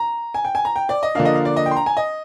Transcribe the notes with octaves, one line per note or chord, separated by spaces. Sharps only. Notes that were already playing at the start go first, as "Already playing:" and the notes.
Already playing: A#5
G#5
G5
G#5
A#5
G5
D5
D#5
D3 F3 A#3 D4 F5
D#5
F5
D5
D#5
G5
C6
A#5
G#5
D#5